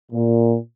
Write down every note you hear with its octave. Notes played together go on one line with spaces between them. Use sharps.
A#2